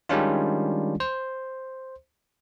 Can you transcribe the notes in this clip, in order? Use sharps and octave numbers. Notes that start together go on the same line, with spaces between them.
D#3 G3 G#3 C#4 D4 F4
C5